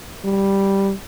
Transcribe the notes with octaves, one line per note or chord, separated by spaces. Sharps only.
G3